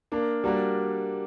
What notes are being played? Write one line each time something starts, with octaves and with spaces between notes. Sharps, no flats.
A#3 D4 A#4
G3 A#3 D4 F#4 A#4